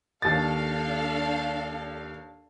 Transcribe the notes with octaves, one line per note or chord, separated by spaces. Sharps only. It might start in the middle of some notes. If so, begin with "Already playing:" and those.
D#2 D4 A4 F5 A6